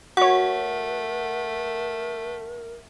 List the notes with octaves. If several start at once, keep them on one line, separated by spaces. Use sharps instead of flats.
A3 F#4 A#4 C#5 F#5